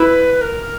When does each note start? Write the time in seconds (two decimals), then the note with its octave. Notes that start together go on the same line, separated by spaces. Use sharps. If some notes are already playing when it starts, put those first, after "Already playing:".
Already playing: E4 B4
0.41 A#4